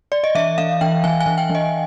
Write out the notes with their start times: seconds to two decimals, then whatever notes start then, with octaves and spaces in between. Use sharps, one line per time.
0.12 D5
0.24 D#5
0.35 E3 E5
0.58 E3 F5
0.81 E3 G5
1.04 E3 G#5
1.20 G#5
1.26 E3
1.38 G5
1.50 E3
1.55 D#5